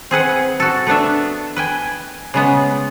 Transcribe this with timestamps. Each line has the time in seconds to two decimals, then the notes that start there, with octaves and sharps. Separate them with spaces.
0.11 C4 G#4 B4 F#5
0.60 F#4 A4
0.87 A3 B3 D4 E5
1.56 B4 G5 G#5
2.34 C#3 G#3 B3